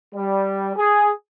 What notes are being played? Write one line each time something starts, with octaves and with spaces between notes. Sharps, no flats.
G3
G#4